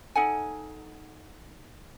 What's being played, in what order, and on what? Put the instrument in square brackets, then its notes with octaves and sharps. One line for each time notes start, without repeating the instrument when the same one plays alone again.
[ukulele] D#4 A4 F#5 G#5